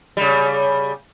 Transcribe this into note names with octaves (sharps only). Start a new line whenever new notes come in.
C#3 G3